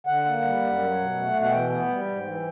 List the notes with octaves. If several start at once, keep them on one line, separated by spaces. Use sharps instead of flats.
D3 F#5
A#3
G3
F#2
F#3
B2
A3
B2
F#5
E3 G5
B3
G3
G#2
E3